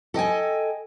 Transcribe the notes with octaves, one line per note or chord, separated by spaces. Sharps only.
A4 D#5 G5 G#5